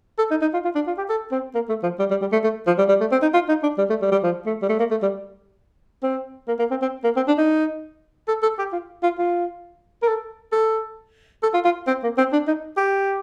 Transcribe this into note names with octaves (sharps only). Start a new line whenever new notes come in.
A4
D#4
D#4
F4
F4
D4
F4
G4
A4
C4
A#3
A3
F3
G3
G3
G3
A3
A3
F3
G3
G3
A3
C4
D#4
F4
D#4
D4
G3
A3
G3
G3
F3
A3
G3
A3
A#3
A3
G3
C4
A#3
A#3
C4
C4
A#3
C4
D4
D#4
A4
A4
G4
F4
F4
F4
A#4
A4
A4
A4
F4
F4
C4
A#3
C4
D4
D#4
G4